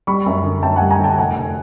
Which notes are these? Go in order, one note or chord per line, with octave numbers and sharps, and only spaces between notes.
G3 B5 C#6
F#2
D3
F#2 G5 A5
F#5 G#5
G3
G#5 A#5
D3 G5 A5
F1 F#5 G#5
F1